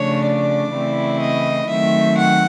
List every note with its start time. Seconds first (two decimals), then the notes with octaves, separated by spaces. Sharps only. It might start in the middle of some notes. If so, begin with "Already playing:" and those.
Already playing: C#3 F3 A3 D4 C#5
0.26 D5
0.74 C#3 E3 A3 C4 E4
1.21 D#5
1.69 D#3 F#3 A3 C4 E5
2.17 F#5